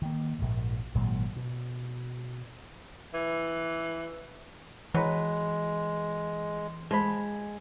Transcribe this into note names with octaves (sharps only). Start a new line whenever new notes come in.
D#3 A#3
A#1 G#2
G#1 A#2 F#3 G#3
B2
E3
E3 F#3 G#3 B4
F3 G#3 B5